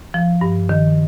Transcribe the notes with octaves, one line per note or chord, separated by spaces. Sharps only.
F3
G2
D#3